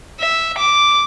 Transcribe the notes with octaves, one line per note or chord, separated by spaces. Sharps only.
E5
D6